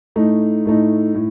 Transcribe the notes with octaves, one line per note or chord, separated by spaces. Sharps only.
A2 A3 D#4
A2 A3 D#4
A2